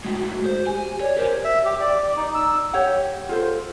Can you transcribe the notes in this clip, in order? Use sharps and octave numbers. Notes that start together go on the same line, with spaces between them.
A2 G#3 F#4
F#4
C5
G4 G#5
C#5 D5
G4 A#4 C5
E5
G4
D5
D#4
E6
G4 C#5 F#5
F4 A4 C5